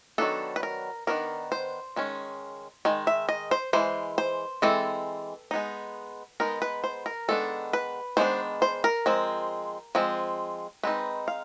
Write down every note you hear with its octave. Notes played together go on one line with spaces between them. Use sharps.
D#3 F#3 B3 D4 A4
B4
A#4
D#3 F#3 B3 D4 A#4
C5
D#3 G#3 C#4
D#3 G#3
E5
D#5
C5
E3 G#3 C5
C5
E3 G#3 C4 A4
G#3 B3 D#4
G#3 B3 D#4 A#4
B4
C5
A#4
D#3 G#3 B3 D4 A4
B4
D#3 G#3 B3 D4 C5
C5
A#4
F3 G#3 C4
F3 G#3 C4
G#3 C4 D#4 B4
F5